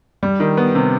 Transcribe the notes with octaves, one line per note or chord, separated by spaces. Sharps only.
G3
D#3
B3
C3